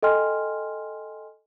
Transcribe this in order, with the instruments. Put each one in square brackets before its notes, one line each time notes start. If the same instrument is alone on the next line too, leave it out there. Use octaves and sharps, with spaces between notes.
[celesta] A4 D#5 G5 G#5 C6 F6